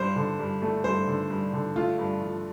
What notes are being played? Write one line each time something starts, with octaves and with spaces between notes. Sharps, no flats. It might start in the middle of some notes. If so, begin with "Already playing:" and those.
Already playing: G2 C5
D3
G2
A3
G2 C5
D3
G2
D3
A3 F4
G2
F3